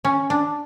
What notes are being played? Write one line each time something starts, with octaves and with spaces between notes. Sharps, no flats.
C#4
D4